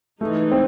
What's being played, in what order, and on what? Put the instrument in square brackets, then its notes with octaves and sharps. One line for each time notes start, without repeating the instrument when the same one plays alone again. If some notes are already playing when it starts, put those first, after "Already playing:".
[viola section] E3 G#3 D#4 [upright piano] A3
[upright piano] C4